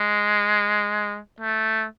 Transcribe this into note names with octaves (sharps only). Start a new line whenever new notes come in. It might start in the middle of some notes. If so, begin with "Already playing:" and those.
Already playing: G#3
A3